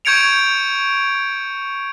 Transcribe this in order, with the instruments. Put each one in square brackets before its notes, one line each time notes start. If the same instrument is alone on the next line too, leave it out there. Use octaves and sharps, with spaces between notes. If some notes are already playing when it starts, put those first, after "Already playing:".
[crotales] C#6 G6 G#6 C#7 D7 F7